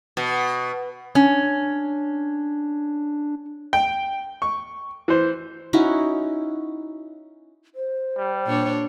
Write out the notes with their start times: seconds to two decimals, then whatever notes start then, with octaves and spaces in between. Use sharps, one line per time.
0.17 B2
1.15 C#4 D4
3.73 G5
4.42 C#6
5.08 E3 C5
5.73 C#4 D#4 E4 F#4
7.75 C5
8.17 G3
8.46 A#2 D4 C#5